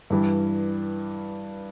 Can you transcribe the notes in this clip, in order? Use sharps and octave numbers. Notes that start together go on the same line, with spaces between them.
G2 E3 G3